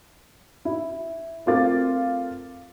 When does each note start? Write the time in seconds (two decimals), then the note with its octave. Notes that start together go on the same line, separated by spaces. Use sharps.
0.65 E4
1.46 A3 C4 F4 A#4 D6 A6